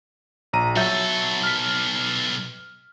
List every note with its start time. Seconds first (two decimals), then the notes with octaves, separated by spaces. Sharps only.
0.53 A#1 A#5 D#7
0.76 B1 F#3 A4 E5 G6
1.43 F6 B6